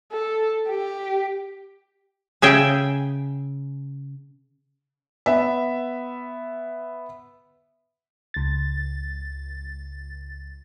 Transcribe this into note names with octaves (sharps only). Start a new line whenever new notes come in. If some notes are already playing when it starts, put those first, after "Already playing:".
A4
G4
C#3 G#4 E5 G5
B3 E5
C#2 A6